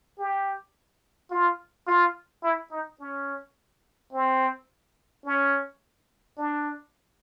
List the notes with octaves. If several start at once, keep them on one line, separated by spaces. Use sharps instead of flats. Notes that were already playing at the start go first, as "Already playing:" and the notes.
G4
F4
F4
E4
D#4
C#4
C4
C#4
D4